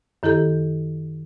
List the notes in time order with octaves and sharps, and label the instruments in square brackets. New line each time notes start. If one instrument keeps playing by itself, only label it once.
[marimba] F#2 D#3 E4 G4 A4 G6